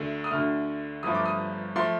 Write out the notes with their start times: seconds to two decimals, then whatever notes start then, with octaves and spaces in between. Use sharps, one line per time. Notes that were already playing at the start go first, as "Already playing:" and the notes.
Already playing: D2 D3 A3
0.24 D#6
0.31 D2 D3 A3 F6
1.03 G1 G2 F3 A3 D#6
1.15 D6
1.26 D#6
1.76 F3 A3 C6